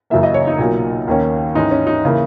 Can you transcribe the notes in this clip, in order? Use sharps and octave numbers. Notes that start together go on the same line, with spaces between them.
F#2 C#3 E3 A#3 E5
D#5
C#5
D#4
B1 A#2 F#3 A#3
D#2 D#3 A#3 C#4
G#2 E3 G#3 C#4 D#4
C#4
D#4
C#3 E3 A#3